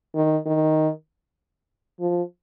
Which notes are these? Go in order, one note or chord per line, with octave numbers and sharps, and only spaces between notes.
D#3
D#3
F3